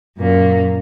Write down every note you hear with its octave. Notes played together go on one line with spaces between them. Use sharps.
F#2 A#2 A#3